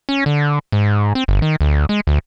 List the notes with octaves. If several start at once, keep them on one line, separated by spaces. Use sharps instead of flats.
C#4
D3
G#2
C4
G1
D#3
D2
G#3
D2